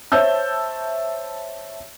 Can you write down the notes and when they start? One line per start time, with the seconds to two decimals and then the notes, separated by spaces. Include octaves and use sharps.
0.12 C5 C#5 E5 A5 E6 G6